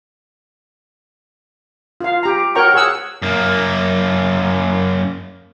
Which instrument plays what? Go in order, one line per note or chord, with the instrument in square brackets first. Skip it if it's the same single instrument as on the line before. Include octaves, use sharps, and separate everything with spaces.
[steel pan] F4 F5
G4 A#5
F#4 A#4 C#5 G5 A#5 C#6
G#4 C#5 F#5 E6
[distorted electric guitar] F#2 A#3